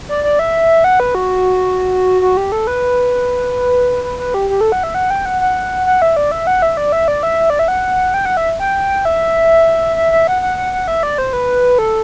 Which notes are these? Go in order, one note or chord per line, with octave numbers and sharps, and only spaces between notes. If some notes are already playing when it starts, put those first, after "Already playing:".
D5
D5
E5
F#5
B4
F#4
F#4
G4
A4
B4
B4
B4
G4
G4
A4
F#5
E5
F#5
G5
F#5
F#5
F#5
E5
D5
E5
F#5
E5
D5
E5
D5
E5
D5
E5
F#5
G5
F#5
E5
G5
E5
E5
E5
F#5
F#5
F#5
F#5
E5
D5
C5
B4
A4